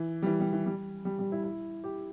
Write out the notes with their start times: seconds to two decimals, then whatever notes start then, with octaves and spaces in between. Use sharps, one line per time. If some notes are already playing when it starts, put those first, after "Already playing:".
Already playing: E3
0.22 G3
0.26 E3
0.40 G3
0.53 E3
0.66 G3
1.05 G3
1.19 G3
1.32 E4
1.44 E4
1.84 G4